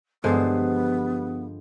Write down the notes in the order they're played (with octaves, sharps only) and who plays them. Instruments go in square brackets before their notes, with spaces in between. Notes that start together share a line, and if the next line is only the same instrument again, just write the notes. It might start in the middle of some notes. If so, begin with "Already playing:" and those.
[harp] G2 F3 [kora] D3 G#3 C5 [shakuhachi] B3